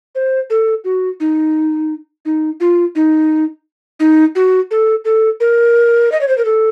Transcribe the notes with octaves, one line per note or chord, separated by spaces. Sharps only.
C5
A4
F#4
D#4
D#4
F4
D#4
D#4
F#4
A4
A4
A#4
D#5
C#5
C5
A#4
A4